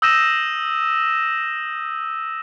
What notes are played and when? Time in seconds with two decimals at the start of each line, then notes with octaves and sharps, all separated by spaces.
0.02 D#6 E6 G6 A#6 D#7 E7